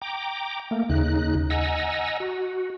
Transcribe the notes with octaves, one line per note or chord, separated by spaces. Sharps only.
G5 A#5 D6
A3 A#3
D#2 C#3 D#4 F#6
D#5 F#5 G#5 A#5 E6
F#4